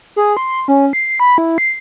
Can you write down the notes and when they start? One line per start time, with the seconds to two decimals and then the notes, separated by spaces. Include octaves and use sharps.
0.16 G#4
0.37 C6
0.68 C#4
0.93 C7
1.20 B5
1.38 E4
1.58 C7